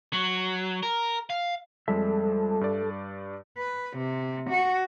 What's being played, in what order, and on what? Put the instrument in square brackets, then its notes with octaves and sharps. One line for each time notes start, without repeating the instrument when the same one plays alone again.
[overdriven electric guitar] F#3
A#4
F5
[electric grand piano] F2 G#3 [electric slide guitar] G3 E5 [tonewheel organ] A4
[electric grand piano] G2 D5
[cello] B4
C3
F#4